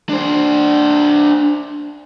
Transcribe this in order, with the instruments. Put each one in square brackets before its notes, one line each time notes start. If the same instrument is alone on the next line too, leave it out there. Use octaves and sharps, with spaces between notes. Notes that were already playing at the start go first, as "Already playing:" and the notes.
[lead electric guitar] D4 C5